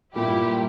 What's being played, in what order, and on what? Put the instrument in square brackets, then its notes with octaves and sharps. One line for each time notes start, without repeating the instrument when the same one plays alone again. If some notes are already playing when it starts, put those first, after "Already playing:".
[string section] G2 G3 A#3 E4 G4 [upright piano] A#2